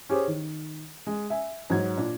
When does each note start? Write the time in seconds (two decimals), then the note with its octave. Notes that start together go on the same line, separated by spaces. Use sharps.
0.09 C#4 G4 G#4 C5
0.28 D#3
1.07 G#3
1.30 E5 G#5
1.70 G#2 F#3 G#6
1.97 A#2 D4